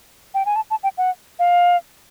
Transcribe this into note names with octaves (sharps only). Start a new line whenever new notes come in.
G5
G#5
A5
A5
G5
F#5
F5